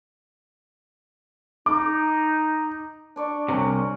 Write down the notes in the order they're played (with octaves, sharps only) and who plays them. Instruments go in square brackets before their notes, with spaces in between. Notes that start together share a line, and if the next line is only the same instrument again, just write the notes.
[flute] D#4 [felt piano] D6
[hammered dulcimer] D4 D5 C#6
[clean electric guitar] C2 F2 C3 [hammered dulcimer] C#4